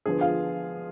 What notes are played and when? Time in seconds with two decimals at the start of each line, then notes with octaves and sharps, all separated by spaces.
0.06 D3 F3 B3 G#4
0.21 F4 F5